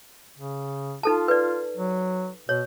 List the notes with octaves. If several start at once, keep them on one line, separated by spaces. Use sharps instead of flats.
C#3
D#4 F4 A4 A5
B4 D5
F#3
B2 C#5